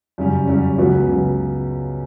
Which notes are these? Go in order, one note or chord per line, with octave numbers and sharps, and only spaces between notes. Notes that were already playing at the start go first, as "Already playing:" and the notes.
F#2 C#3 G3 C#4
F#2 C#3 G3 C#4
C#2 C#3 F#3 B3
C#2 C#3 F#3 B3